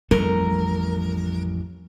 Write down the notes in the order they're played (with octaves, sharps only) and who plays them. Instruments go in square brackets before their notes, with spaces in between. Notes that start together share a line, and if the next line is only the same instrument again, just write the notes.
[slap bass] A1 F2 A3 [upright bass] G3 [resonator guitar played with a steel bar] A#4